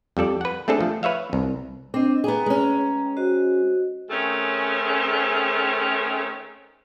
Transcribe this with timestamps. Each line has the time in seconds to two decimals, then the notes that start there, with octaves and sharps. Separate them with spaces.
0.17 F2 G3 A4 D5
0.41 B4 F#5
0.68 A3 C4 D4 G#4 A4
0.81 F3 A3
1.03 B4 C#5 E5 F5
1.33 C2
1.94 C4 D4 C5 D#5
2.24 B3 G#4 G5 A#5
2.46 G#3 C#4
3.17 F#4 C5 D#5
4.10 D#3 A3 C4 C#4 G#4